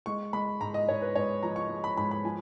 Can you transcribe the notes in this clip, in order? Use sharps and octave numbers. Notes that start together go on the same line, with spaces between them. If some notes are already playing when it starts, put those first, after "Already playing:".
G#3 C#6
G#3 B5
G#2 A#5
D#5
G#2 C#5
B4
G#2 C#5
F3 A#5
C#6
G#3
B5
G#2 B5
B5
F3 G#5